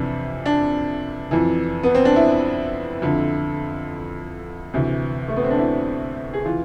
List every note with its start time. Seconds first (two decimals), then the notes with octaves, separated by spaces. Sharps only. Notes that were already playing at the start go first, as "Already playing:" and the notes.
Already playing: F2 C3 E3 D4
0.46 D4
1.31 F2 E3
1.83 B3
1.95 C4
2.05 D4
2.16 E4
3.02 F2 D3
4.74 D2 C3 E3
5.28 A3
5.36 B3
5.44 C4
5.51 D4
5.59 E4
6.33 G#4
6.45 E3 F4